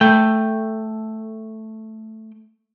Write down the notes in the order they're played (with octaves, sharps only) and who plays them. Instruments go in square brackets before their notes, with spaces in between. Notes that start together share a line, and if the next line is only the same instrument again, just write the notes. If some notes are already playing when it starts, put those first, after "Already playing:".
[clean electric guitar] A3 G5